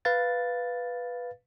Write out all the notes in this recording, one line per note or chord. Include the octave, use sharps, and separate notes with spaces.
B4 F5 A6